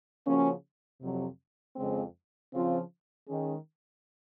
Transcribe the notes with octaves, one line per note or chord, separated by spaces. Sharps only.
C#3 F3 A#3 C#4 F#4
F2 C3 F#3
F2 C#3 G#3 C4
C#3 F3 C4 F4
D#3 G#3 C#4